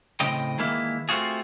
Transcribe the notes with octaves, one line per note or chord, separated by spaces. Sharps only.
A2 C#3 C4 D#5 G5
D#3 E3 G#3 A#3 E4
A3 C4 F4 F#4 G#4